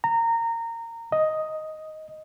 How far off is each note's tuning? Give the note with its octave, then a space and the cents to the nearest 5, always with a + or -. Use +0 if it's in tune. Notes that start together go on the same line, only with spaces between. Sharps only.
A#5 -20
D#5 +5